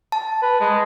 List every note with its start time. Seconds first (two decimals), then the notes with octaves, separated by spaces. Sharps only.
0.12 A5
0.42 B4
0.60 G#3